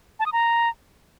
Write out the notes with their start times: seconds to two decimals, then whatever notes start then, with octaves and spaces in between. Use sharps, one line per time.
0.20 A5
0.26 D#6
0.33 A#5